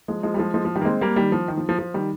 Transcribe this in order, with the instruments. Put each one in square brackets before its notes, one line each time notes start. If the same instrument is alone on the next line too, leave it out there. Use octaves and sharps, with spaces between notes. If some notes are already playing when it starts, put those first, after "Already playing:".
[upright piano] F3 G#3
F3 G#3
G3
F3 G#3
F3 G#3
F3
D#3 G3
A#3
G#3 C4
G3 A#3
D#3 G3
F3
D#3
F3
F3
F3
D#3 G3